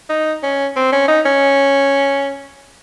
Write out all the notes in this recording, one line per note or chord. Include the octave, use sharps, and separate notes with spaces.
D#4
C#4
C4
C#4
D#4
C#4